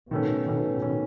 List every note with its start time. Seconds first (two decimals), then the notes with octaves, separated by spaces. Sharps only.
0.11 B2 D#3 A3 C#4
0.46 B2 D#3 A3 C#4
0.82 D#3 A3 C#4